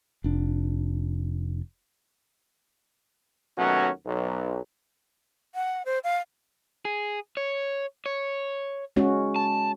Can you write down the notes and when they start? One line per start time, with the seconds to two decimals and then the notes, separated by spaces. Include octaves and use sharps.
0.24 F1 D4
3.58 D#2 B2 F#3 A3 C#4 F#4
4.06 B1
5.55 F#5
5.85 C5
6.04 F5
6.85 G#4
7.37 C#5
8.06 C#5
8.96 G#3 C#4 F#4
9.36 A5